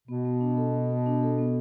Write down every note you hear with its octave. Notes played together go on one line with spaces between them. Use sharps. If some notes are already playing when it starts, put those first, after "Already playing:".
B2 B3
B3
D4
A4
B3
B3
D4
A4
B3